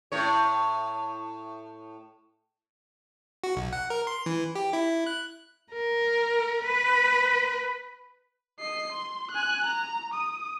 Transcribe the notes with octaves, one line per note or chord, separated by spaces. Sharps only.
A2 C#5
F#4
B1
F#5
A#4
C6
E3
G4
E4
F#6
A#4
B4
D#5 C7
C6
G#5 F#6
A#5
D#6